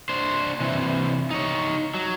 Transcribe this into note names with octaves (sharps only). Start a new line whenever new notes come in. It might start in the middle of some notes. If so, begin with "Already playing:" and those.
D4 C5
C3 E3
D#4 C#5
F#3